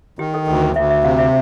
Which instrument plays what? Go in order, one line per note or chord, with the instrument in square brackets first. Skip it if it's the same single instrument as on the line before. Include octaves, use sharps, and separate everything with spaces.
[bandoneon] D#3 [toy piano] G4
[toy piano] A4
[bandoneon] D2 [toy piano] A4
[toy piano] A#4
[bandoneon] D2 [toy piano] E5
[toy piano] E5
[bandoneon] C3 [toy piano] F5
[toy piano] E5